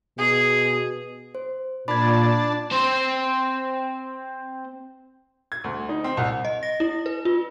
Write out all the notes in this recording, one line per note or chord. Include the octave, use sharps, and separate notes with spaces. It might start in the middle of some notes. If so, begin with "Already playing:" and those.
B2 G#4
C5
A#2 D4 A5 B5 G#6
C4 C5
G#6
D2
D#4
C4
C2
D#5
A#6
E4
B4
F4